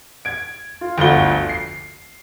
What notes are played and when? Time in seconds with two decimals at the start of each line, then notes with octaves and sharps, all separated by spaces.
0.25 G#6 D7
0.81 F4
0.98 G1 D2 F3 F#4 G7
1.49 C7